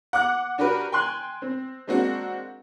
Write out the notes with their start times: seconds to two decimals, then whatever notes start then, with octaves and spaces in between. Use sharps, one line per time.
0.13 F#5 D6 F#6
0.58 D4 F#4 G4 A#4 B4
0.92 G5 G#5 C6 F#6
1.42 C4
1.87 G#3 A#3 C4 D4 F#4